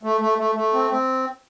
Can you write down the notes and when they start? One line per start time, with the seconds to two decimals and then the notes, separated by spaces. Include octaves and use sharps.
0.03 A3
0.21 A3
0.38 A3
0.55 A3
0.73 C4
0.91 C4